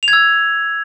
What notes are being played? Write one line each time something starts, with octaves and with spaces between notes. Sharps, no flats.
F7
G#6
E6